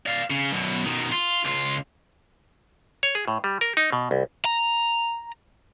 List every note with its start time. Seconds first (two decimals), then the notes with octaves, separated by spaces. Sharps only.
0.06 D5 F5
0.31 C#3
0.53 F#2 B2
0.86 B2 D#3
1.12 F4
1.45 C#2 F4
3.03 C#5
3.15 G#4
3.28 A2
3.44 G3
3.61 A#4
3.77 D#4
3.92 B2
4.11 C2
4.45 A#5